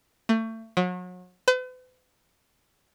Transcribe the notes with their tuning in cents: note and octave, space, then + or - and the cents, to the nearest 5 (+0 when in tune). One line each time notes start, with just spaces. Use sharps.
A3 +30
F#3 -35
B4 +45